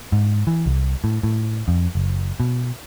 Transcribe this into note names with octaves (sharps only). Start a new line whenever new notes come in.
G#2
E3
C2
A2
A2
F2
F#1
B2